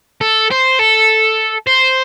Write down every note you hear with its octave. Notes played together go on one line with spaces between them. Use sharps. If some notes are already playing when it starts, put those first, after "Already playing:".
A4
C5
A4
C5